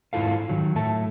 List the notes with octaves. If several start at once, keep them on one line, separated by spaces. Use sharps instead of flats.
G#2 E4 F4 A4 F5
D#3 F#3
A2 A4 E5 A5